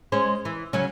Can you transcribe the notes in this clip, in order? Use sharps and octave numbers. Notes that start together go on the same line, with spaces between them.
G#3 C#4 C5
E3
C#3 F#3 C#4